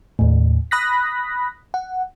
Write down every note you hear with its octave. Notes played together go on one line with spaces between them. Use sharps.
D#2 A2
B5 D#6 F#6 A#6 B6
F#5